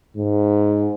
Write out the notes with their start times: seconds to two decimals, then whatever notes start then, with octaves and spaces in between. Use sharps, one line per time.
0.16 G#2